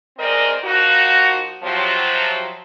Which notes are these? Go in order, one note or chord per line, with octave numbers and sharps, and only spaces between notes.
E2 G#3 C4 A#4 D5 D#5
F3 A#3 D#4 F#4
C3 F3 F#3